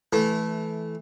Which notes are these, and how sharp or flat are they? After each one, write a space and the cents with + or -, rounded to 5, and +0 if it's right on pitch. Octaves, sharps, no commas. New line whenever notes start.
E3 +0 A3 -15